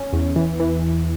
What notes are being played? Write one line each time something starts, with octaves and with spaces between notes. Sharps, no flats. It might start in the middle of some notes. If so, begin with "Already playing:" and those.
Already playing: C#4
E2
E3
E3